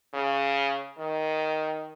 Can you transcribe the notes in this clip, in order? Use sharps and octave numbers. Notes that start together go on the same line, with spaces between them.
C#3
D#3